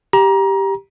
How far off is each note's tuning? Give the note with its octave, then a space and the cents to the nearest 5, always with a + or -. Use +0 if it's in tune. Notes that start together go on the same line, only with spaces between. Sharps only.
G4 +0 A#5 +25